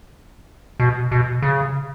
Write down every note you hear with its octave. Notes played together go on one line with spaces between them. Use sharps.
B2
B2
C#3